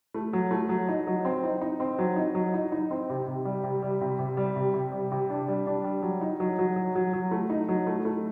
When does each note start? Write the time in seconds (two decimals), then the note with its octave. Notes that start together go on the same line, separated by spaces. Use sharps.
0.14 A3
0.33 F#3
0.51 A3
0.69 F#3
0.89 D#4
1.07 F#3
1.25 C4
1.44 D#4
1.61 D#4
1.80 C4
1.99 F#3
2.16 D#4
2.35 F#3
2.54 D#4
2.72 D#4
2.91 C4
3.09 C3
3.28 C3
3.45 G3
3.64 C3
3.82 G3
4.01 C3
4.19 C3
4.37 G3
4.56 C3
4.74 C3
4.92 G3
5.12 C3
5.30 D4
5.48 G3
5.67 D4
5.84 G3
6.02 F#3
6.21 D#4
6.40 F#3
6.59 F#3
6.76 F#3
6.95 F#3
7.13 F#3
7.31 A3
7.50 D#4
7.69 F#3
7.87 A3
8.05 A3